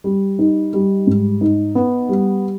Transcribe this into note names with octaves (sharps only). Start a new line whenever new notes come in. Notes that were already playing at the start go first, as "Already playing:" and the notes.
G3
D#4
G3
G#2
D#4
B3
G3